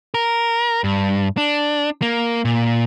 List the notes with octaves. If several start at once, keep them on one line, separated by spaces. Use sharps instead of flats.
A#4
G2
D4
A#3
A#2